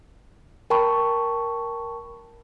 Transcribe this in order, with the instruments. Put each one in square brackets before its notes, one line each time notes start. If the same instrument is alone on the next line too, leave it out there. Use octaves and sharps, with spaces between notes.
[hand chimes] A#4 G5 A5 B5 C#6